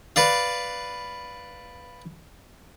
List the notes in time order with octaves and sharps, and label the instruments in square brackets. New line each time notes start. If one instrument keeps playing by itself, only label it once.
[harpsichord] B4 D5 F5